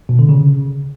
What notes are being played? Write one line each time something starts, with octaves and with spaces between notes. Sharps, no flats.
B2
D3
C#3